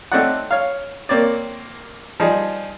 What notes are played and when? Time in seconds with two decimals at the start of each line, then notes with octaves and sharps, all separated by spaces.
0.12 A3 C4 D#4 C#5 D5 F#5
0.51 C#5 F5
1.09 A#3 C4 C#5 D5
2.20 F3 G3 D#4 G#4